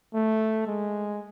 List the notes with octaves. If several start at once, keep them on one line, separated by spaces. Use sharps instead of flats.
A3
G#3